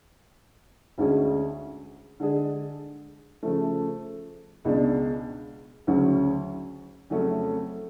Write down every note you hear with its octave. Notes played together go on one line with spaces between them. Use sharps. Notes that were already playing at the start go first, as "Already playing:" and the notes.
D2 D3 G#3 C#4 G#4
D3 G#3 D4 G#4
C#3 F3 A3
C#2 B2 G#3 D4
D2 C#3 F#3 C#4
F2 C#3 F#3 A3 C#4